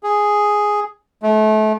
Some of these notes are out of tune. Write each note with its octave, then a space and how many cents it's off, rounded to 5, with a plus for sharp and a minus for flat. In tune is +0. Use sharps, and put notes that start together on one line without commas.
G#4 +0
A3 -30